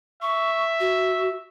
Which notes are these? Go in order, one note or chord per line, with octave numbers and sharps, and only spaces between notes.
E5 C#6
F#4